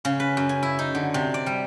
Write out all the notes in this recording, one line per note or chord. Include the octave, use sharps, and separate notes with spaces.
C#3
B4
F#2
G#5
E4
D#4
D3
C3
D5
G3